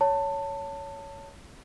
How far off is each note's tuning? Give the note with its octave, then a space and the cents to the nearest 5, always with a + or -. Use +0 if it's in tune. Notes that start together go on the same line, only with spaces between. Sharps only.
C#5 +15 A5 +20